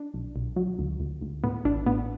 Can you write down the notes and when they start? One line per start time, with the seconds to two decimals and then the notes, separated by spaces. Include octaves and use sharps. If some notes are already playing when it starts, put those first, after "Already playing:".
Already playing: D4
0.14 B1
0.36 B1
0.56 F#3
0.79 D2
1.00 D2
1.21 D2
1.43 A2 B3
1.65 A1 D4
1.86 A2 B3